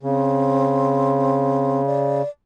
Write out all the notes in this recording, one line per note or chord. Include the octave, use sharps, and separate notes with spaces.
C#3 C4
D5